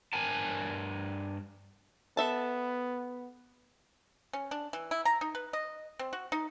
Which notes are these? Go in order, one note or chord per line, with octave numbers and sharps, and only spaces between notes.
G2 A#4 G#5 A5
B3 A4 E5 A5
C#4
D4
E3
E4
A#5
D#4
B4
D#5
C4
F#4
D#4